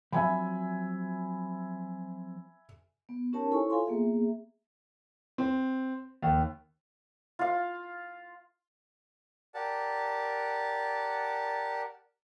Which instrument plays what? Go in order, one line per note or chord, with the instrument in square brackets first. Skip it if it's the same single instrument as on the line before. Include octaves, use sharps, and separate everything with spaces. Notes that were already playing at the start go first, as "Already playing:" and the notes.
[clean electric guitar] F3 F#3 C4 [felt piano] E5 G#5 B5
[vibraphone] B3
C#4 D#4 G4 A#4 C#5 A5
E4 A4 C5 C#5 G#5 C#6
F4 A4 F5 G#5 C6
A#3 B3 G#4 E5
[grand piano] C4
D#2
[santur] F4 F5
[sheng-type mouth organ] G4 A#4 D5 F#5 A5